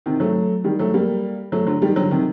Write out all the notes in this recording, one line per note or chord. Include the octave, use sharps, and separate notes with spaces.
C3 D#3
F#3 A3
D#3 G3
F#3 A3
G3 A#3
F#3 A3
D3 F#3
D#3 G3
D3 F#3
C3 D#3